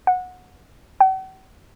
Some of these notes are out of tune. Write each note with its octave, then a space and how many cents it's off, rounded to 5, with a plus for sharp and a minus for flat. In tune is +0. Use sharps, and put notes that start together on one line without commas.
F#5 -20
F#5 +45